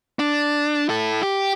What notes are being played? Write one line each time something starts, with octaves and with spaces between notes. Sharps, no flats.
D4
E4 A4
G4